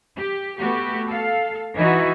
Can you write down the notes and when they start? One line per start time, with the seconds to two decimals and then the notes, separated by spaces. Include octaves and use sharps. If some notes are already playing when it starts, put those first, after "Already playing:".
0.16 G4
0.58 A3 B3 F#4 G4
1.10 A4 F5
1.75 E3 D#4 E4 F#4